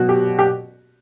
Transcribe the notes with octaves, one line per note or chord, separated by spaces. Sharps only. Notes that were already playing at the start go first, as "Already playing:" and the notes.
Already playing: B2 F#3 F#4
G4
G4